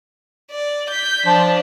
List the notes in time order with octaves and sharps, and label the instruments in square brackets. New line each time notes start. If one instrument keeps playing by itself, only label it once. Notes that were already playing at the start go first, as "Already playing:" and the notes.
[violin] D5
G6 B6
[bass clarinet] F3 [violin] D4